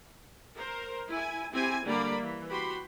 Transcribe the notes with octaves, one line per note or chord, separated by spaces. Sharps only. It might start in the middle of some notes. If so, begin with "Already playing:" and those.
A#4 C5
E4 G#5
C4 E4 G4 G#5
D3 G3 A#3 D5 B5
E3
F#4 G4 B5 C6